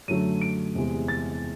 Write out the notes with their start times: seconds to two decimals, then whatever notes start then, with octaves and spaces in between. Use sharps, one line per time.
0.08 F#2 D3 F#3 A3 D#7
0.41 D7
0.75 E2 C3 E3 G#3
1.08 A6